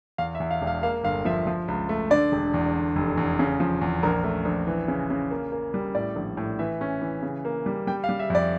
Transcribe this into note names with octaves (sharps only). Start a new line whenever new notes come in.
E2 F5
E5
E2
F5
E1
F5
A#3 F5
G1 F5
F3 E5
F3
C#2
A3
D3 D5
E1
E2
D3
F1
E2
C#3
F3
E2
A#1 A#4
A3
A#1
E3
C#3
C#3
A#3
A#3
G3
A2 D5
A#1
A2
E3 E5
C#4
E3
C#3
A#3
G3
G3 G5
F5
G3
E5
F2
D5